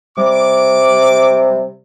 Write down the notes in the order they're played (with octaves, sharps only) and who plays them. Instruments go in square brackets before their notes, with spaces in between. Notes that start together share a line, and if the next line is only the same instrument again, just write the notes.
[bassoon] C3 [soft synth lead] G3 [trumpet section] D6